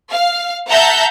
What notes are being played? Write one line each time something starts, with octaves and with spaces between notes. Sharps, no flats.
F5
E5 F#5 A5 A#5 G6